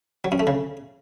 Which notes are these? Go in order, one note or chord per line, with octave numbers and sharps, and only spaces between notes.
F#3
F#2
A3
C#3